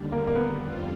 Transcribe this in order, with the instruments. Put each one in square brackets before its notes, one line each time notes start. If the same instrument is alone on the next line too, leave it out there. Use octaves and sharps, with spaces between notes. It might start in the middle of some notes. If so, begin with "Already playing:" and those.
Already playing: [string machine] D#2 D3 G3
[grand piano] A#3
A#3
B3
[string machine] F2 D3 G3 C4 F4